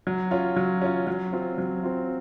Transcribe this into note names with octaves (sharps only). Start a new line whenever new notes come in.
F#3
C#4 F4
F#3
C#4 F4
F#3
C4 F4
F#3
C4 F4